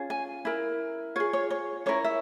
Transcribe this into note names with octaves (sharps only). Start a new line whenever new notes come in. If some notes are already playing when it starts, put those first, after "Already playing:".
Already playing: C#4 F4 G#4
G#5
E4 A#4
F4 G#4 C#5
C#5
C#5
C#4 E4 A#4 C#5
E5